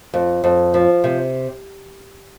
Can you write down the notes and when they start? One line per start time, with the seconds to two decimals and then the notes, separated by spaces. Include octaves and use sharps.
0.14 F2
0.44 F2
0.74 F3
1.04 C3